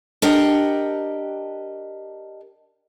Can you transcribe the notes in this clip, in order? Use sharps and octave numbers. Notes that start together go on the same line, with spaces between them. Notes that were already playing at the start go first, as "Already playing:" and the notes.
D4 G4 A#4 D#5 F#5 G5